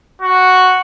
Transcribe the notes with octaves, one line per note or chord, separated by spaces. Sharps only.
F#4